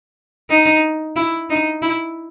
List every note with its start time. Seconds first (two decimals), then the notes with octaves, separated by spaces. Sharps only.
0.50 D#4
1.16 E4
1.50 D#4
1.82 E4